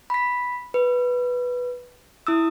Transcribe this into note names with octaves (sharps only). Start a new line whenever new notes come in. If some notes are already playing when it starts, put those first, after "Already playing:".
B5 B6
B4
E4 D#6 E6